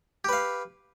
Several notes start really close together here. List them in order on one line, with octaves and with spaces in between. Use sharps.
G4 B4 F5